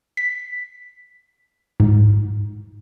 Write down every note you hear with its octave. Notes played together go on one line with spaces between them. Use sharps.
B6
G#2